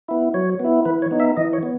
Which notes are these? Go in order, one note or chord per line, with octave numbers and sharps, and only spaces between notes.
B3 E4
F#3 C#5
B3 E4
E3 B4
C#5
B3 D#4
E5
E3 D#5
C#5
B3